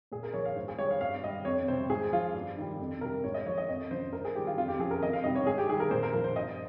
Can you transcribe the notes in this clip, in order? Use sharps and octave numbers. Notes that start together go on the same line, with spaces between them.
A#2 G#4
A#4
F3 C#5
F5
G#2 C5
G#4
G3 C#5
F5
G2 F5
G3 D#5
F2 C#5
C3 G3 C5
G#2 G#4
F3 F4
G2
D#3 G3
F2
C3 G3 A#4
G#2 C#5
D#5
F3 C#5
D#5
F2 D#5
C#3 F3 C5
G2 A#4
G#4
D#3 G3 G4
F4
F2 F4
G4
C#3 F3 G#4
A#4
F2 D#5
F5
C3 D#3 G3 D#5
C#5
G#2 G#4
G4
D#3 G3 G#4
A#4
A#2 C5
A#4
F3 A#4
C5
G2 D#5